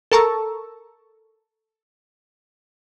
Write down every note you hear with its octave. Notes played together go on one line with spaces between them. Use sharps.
A4 A#4 A5 A#5 C#6 E6